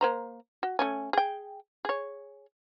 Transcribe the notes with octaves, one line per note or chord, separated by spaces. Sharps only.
A#3 C5 A#5
F#4
A3 C#4 G#5
G#4 G5
G#4 C#5